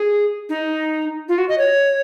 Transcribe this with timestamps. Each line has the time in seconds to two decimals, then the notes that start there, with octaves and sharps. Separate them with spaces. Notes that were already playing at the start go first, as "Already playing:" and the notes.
Already playing: G#4
0.49 D#4
1.29 F4
1.38 F#4
1.49 D#5
1.58 C#5